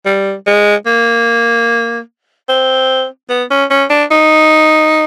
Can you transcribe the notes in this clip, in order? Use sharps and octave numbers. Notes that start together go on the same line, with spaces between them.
G3
G#3
A#3
C4
B3
C#4
C#4
D4
D#4